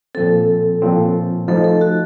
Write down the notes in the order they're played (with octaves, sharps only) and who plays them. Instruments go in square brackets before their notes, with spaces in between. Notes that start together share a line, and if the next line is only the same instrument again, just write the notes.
[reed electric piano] A#2 F3 C4 [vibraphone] A4
[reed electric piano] A#2 F3 C4
[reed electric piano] F3 A3 D#4 [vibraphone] A4
[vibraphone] A4
F#4